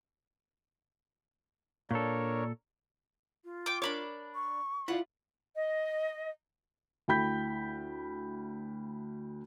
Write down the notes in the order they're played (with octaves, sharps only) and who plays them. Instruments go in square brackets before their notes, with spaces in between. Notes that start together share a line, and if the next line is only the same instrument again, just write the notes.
[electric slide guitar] A#2 A4 [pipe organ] D4 A#4 C#5
[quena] F4
[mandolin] G5 D6
[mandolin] D4 B5 D6 [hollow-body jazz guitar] A#4 C#5
[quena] C#6
[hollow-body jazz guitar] E4 F4 D5 [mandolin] F#5
[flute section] D#5
[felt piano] D2 E4 G5 B5 G6 B6